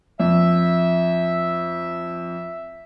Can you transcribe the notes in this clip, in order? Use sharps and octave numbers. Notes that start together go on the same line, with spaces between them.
F2 E5